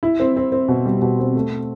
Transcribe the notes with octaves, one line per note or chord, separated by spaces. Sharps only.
E4
C4
C4
C4
B2
G3
B2
C4
A3